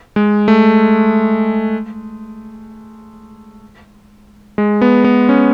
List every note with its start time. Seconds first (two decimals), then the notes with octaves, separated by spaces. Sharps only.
0.16 G#3
0.48 A3
4.58 G#3
4.81 B3
5.04 B3
5.29 C#4